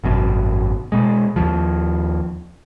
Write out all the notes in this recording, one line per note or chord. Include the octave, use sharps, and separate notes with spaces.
G#1 F#2 B2
B2 G#3
D#2 F3